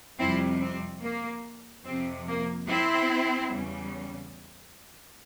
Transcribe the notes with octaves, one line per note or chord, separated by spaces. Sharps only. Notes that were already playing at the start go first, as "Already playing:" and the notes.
F2 C3 G3 C4 E4
C4
A#3
F2 C3 F3 C4
A#3
C4 E4
E2 C#3 G3